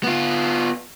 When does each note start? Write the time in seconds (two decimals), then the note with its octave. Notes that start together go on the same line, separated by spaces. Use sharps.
0.04 B3 F4